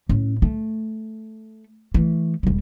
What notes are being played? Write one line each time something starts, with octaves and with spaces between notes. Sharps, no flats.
A2 C#4
A3
E3 A3
E1 G3